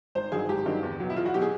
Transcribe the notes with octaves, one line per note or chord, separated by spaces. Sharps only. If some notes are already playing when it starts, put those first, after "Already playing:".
G#1 C5
G2 D#3 F#3 G#4
G#1 G4
G2 D#3 F#3
E2
B2 F#3
E4
E2 F4
F#4
B2 F#3 G4
G#4